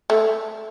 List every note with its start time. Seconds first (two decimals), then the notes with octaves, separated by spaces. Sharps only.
0.10 A3